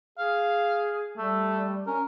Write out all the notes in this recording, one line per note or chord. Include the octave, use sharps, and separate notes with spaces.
G#4 F5
G3 A3
C#4 A#4